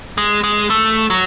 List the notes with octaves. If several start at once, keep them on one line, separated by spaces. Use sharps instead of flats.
G#3
G#3
A3
F#3